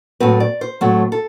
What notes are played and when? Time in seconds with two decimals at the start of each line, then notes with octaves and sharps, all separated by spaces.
0.20 A2 F#3 A3 C4 B4
0.40 D5
0.61 C5
0.81 A2 F#3 A3 C4
1.12 A4